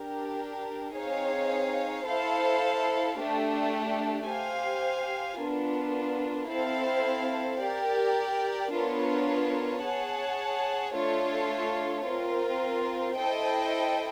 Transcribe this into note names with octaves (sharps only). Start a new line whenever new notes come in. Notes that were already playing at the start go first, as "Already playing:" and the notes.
Already playing: D4 G4 A#4
C4 D#4 G#4 C#5 F5
E4 A4 C5 F5
A3 D4 G4
G4 C5 F5 G#5
B3 D4 F4 A#4
C4 E4 A4 C5 F5
G4 A#4 D5
B3 D4 F4 A#4 C#5
G#4 C#5 F#5 A5
A3 D4 F4 A4 C#5
C4 F4 A#4
E4 A4 C5 D#5 G5